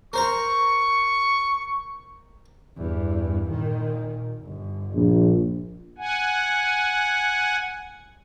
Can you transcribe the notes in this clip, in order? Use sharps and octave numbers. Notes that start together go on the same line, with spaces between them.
A#4 C5 A#5 C#6
E2 G2
A#2 D#3
G1
A#1
F#5 G#5